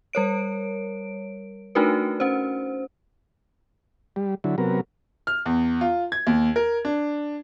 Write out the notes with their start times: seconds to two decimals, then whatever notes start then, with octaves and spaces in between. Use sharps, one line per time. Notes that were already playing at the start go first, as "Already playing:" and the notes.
0.13 G3 A#4 C#5 D7
1.75 A3 D4 D#4 F#4 A#4 B4
2.20 C#4 C5
4.16 G3
4.44 D3 F#3 E4
4.58 C3 F#3 B3 A#4
5.27 F6
5.46 E2
5.81 F4
6.12 G#6
6.27 D#2
6.56 A#4
6.85 D4